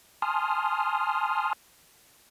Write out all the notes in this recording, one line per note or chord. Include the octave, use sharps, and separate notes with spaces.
G#5 A5 C6 D#6 F6